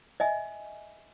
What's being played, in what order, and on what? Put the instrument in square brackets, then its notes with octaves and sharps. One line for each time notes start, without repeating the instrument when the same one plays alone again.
[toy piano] D#5 E5 G#5